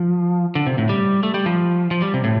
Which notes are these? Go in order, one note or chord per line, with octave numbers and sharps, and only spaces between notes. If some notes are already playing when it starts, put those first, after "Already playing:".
Already playing: F3
D3
C3
A2
G3
A3
G3
F3
F3
G3
C3
A2